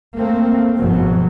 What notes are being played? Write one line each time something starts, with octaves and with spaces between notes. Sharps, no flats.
A3 A#3 C4
G1 G#2 B2 F3 F#3